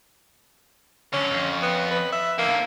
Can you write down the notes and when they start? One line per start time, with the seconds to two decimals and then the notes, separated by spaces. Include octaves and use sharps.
1.13 D3 F#3 C#4
1.31 F2
1.62 B3
1.91 B4
2.12 E5
2.38 D#2 D3 A#3